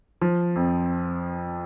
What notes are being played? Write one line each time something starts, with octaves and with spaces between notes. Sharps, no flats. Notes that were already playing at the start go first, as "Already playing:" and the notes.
F3
F2